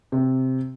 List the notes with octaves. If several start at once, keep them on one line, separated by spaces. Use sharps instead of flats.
C3